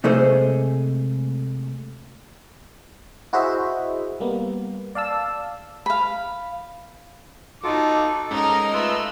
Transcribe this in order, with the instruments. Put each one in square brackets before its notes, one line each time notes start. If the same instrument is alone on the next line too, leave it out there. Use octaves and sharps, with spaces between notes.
[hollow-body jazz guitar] C3 G#3 A3 G#4 C5
[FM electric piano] E4 F#4 G#4 C5 D#5 E5
G3 A#3 B3
D5 F5 A5 E6
[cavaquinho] F5 B5
[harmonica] D#4 D6 [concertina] F4 A4 [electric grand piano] F#4
[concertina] A4
[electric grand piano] G#2 C#4 [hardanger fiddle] D#4 A#4 [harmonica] D#5
[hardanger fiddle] A3 [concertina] F4 B4 E6